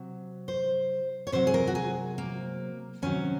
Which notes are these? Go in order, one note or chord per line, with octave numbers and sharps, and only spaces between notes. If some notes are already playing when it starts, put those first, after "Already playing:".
Already playing: C3 F#3
C5
C#5
C3 F#3 C5
G#4
A#4
F#4
G#4
A#3
C3 D#3 F#3 C#4